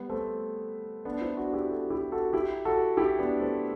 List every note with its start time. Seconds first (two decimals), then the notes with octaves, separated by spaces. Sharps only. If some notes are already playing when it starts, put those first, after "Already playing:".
Already playing: G3 B3
0.09 A3 C4
1.05 B3 D4
1.21 C4 E4
1.37 D4 F#4
1.53 E4 G4
1.70 F#4 A4
1.90 E4 G4
2.12 F#4 A4
2.33 E4 G4
2.65 F#4 A4
2.97 E4 G4
3.19 B3 D4
3.40 A3 C4